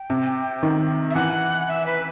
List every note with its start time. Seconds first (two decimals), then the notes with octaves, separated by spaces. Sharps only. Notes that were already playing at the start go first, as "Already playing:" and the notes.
Already playing: G5
0.10 C3
0.63 D#3
1.11 E5
1.15 E3 F#5
1.68 E5
1.86 B4